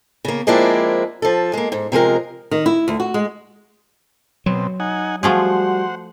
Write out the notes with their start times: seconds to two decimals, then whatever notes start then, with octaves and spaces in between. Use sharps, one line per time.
0.25 C#3 A#3
0.47 F3 G#3 A#3 C4 D4 E4
1.22 F3 A4
1.53 G#3 A#3
1.72 G#2
1.92 C3 F3 G#3 A#4
2.51 D#3
2.66 E4
2.88 D2
3.00 F#4
3.14 G#3
4.46 B2 F#3 C4
4.80 D#4 F#5 G#5
5.23 F3 G3 A3 F#4 G#4 C5 F#5